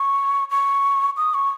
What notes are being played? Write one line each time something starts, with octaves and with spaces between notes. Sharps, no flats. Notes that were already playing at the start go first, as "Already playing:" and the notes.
Already playing: C#6
C#6
D#6
C#6